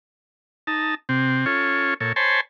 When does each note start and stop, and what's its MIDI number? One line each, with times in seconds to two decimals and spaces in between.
0.67 0.95 63
0.67 0.95 81
1.09 1.45 48
1.09 1.45 60
1.46 1.94 61
1.46 1.94 65
1.46 1.94 69
1.46 1.94 73
2.01 2.13 46
2.01 2.13 69
2.01 2.13 73
2.16 2.41 72
2.16 2.41 73
2.16 2.41 80
2.16 2.41 81
2.16 2.41 83
2.16 2.41 84